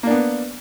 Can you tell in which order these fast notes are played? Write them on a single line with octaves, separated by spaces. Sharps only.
A#3 D4 B3